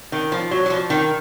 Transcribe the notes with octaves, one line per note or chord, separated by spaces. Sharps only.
D#3
F3
F#3
F#3
F3
D#3